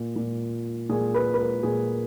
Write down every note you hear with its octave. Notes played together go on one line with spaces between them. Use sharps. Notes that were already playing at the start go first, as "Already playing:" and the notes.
Already playing: A#2
A#2
A#2 G#4
B4
B4
A#4
A#2 G#4